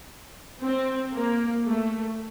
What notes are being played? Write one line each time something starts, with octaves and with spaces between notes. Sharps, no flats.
C4
A#3
A3